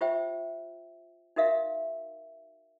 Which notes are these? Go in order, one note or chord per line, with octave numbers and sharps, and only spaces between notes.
F4 G4 C5 E5 G5
D#4 F#4 A#4 E5 F5